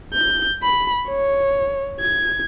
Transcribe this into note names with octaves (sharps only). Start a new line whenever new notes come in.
G6
B5
C#5
G#6